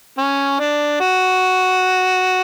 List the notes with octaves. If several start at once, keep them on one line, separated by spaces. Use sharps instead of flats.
C#4
D4
F#4